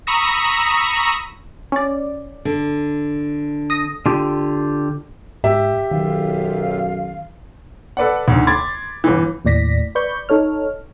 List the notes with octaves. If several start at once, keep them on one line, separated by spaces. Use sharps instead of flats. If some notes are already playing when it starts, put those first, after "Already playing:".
A#5 B5 C#6 D#6 E6 A#6
C#4 D5
D3
D#6 A#6
D3 F4 G4
G#2 G4 E5
B1 F#2 D#3 F5
A4 B4 D5 F#5
D2 G#2
B5 C6 D6 G#6 A6
G1 E3
D#2 A2 D5 A#6 B6
B4 D5 B5 C#6 G6
D#4 A4 C#5 F6